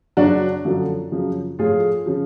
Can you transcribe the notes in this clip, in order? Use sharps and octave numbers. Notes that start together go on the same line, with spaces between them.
F#2 C#3 F#3 D4 F#4
F#2 D3 F3
F#2 C#3 F3
A2 F3 F4 G#4
C#3 F3